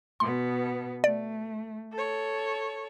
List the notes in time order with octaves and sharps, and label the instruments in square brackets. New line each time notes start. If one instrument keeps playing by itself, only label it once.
[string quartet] B2 B3 [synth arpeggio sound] C6
[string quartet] A3 [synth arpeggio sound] D5
[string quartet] A4 C#5